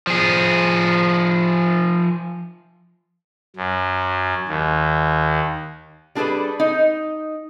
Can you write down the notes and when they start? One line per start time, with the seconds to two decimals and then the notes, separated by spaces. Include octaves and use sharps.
0.07 F3 G#4
3.56 F#2
4.48 D#2
6.15 G3 D4 G#4 A4 B4 D5
6.60 D#4